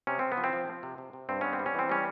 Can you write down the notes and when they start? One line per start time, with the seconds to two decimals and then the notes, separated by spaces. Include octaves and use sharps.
0.07 C3 C#4
0.19 C3 C4
0.32 B3
0.37 F3
0.44 C4
0.53 F3
0.68 F3
0.83 C3
0.98 C3
1.13 C3
1.29 G2 C4
1.41 B3 C#4
1.53 C4
1.59 G3
1.66 C#4
1.74 E3 C4
1.89 G3 C#4